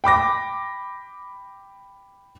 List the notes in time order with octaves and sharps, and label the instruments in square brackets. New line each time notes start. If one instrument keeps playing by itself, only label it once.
[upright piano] G5 B5 D6 A#6